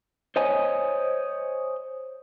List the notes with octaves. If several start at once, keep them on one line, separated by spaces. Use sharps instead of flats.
C5 C#5 D#5 G#5